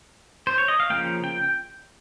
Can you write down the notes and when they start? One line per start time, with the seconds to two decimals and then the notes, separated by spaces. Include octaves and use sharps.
0.47 C5
0.58 C#5
0.68 D#5
0.80 F5
0.90 C#3 F3 A#3 G5
1.24 G5